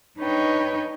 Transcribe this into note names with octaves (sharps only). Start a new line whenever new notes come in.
D4 D#4 B4 C#5 D#5 G5